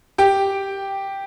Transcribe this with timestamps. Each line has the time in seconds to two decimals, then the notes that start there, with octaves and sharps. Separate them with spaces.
0.18 G4 G5